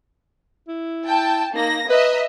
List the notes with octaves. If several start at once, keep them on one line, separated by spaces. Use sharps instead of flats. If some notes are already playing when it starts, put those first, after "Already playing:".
E4
G5 A5
A#3 D#4 A#6
B4 D#5 E5 A#5